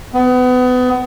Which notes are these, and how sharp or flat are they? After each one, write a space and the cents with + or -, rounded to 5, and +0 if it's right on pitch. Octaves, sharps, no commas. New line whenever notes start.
B3 +30